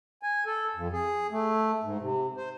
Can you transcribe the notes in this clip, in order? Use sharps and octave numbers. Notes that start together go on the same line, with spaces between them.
G#5
A4
F2
G#4
A3
G#2
C3
C5